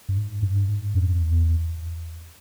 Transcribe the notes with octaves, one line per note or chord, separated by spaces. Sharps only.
G2
G#2
G2
G#2
F2
E2